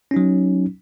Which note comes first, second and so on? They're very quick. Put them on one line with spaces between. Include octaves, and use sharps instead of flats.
C#4 D#4 F#3